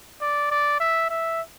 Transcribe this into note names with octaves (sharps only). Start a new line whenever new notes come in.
D5
D5
E5
E5